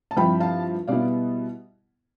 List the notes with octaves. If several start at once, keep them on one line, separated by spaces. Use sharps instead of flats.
A5
G2 F3 C4 E4 G5 B5
F5 A5
B2 G3 B3 E4 D5 F5